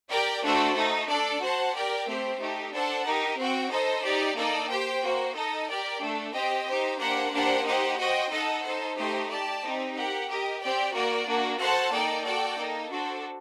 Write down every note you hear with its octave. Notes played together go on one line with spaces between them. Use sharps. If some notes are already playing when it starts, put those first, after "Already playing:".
G4 A#4 D5 G5
A3 D4 F#4 A4 C5
A3 D#4 A4
D4 A4 D5
F#4 C5 F#5 A5
G4 A#4 D5 G5
A3 C4 G4 C5
A3 D#4 G4
D4 A4 C5 F#5 A5
D#4 G4 A#4
C4 F#4 C5 G5
D#4 A4 C5 D#5
D#4 G4 D5
A#3 D#4 A4 D5
G4 C5 G5
A#3 F#4 C5
D#4 A4 D#5
G4 A#4 D5 G5
A3 D4 A4
C4 G4 C5 D#5 G5
D#4 G4 C5
A#3 D4 G4 C5 F#5
A#3 D4 G4 C5 F#5
D#4 G4 C5 F#5
F#4 C5 D#5 G5
D#4 A4 D#5 F#5
D#4 A4 C5
A3 D#4 G4 C5 D#5
G4 D5 A5
C4 D#4 G4
G4 A#4 F#5
G4 A#4 D#5
C4 G4 D5 G5
A#3 F#4 A#4 D5
A#3 D4 F#4
F#4 A4 C5 F#5 A5
A#3 D#4 A4 D5 G5
F#4 A4 D5 G5
A#3 D#4 A4
D4 F#4 A4 C5